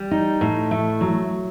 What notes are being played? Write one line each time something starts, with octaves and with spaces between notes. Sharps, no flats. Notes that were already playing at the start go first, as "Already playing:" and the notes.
Already playing: G3
D#4
A2
A3
F#3